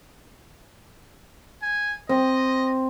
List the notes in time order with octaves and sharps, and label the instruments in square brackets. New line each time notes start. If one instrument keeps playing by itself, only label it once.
[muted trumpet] G#5
[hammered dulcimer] C4 [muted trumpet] D#5